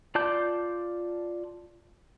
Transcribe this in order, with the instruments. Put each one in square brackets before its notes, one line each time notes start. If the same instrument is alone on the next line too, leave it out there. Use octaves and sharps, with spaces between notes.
[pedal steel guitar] F4 D5 A5 D6 G6